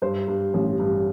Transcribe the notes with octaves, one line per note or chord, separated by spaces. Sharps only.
G2 C5
G2
A1
G2